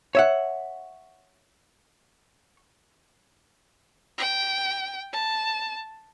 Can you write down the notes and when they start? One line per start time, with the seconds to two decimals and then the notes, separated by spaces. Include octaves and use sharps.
0.15 C#5 E5 F#5
4.18 G5
5.13 A5